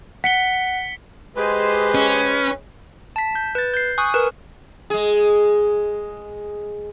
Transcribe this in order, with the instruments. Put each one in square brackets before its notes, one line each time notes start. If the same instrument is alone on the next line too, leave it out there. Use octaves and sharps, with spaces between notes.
[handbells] F#5 [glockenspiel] B6 C#7 G7
[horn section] G#3 G4 C5 [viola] G#4 D#5 [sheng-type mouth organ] B4
[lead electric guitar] C#4
[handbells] A5 B6
G6
B4 A6
G6 C7
G#5 C#6 D#6 F#6
A#4 B4
[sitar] G#3 G#4